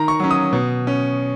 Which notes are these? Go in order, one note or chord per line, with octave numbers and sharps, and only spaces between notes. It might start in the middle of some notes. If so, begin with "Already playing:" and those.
Already playing: D#3 A#5
C#6
F#3 C#4
D#6
B2
C#4